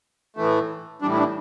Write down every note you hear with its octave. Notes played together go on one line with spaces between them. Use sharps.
A2 E3 A3
A2 E3 G3 D4
E4
D4